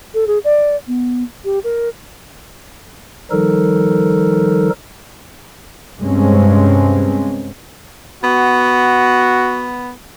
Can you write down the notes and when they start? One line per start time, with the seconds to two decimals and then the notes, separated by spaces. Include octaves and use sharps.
0.14 A4
0.27 G#4
0.44 D5
0.87 B3
1.45 G4
1.64 A#4
3.31 D#3 F3 G3 D#4 A4 A#4
6.00 G2 C3 G#3 C4 C#4
8.23 B3 F#4